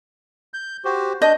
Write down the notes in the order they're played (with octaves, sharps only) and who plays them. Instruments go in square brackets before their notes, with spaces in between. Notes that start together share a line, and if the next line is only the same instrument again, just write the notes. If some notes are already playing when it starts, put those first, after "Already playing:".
[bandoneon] G6
F#4 G4 C5
[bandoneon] D4 G6 [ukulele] D#5